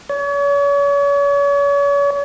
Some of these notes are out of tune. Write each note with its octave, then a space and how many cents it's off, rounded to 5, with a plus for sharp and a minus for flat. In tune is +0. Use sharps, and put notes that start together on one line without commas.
C#5 +40